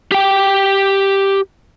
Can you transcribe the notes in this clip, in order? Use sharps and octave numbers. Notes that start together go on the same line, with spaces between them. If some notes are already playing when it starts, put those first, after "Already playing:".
G4 G5